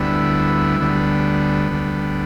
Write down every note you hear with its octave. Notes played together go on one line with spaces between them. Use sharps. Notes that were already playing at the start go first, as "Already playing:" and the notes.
Already playing: D2 D3 G3 B3 E4
D2 D3 G3 B3
D2 D3 G3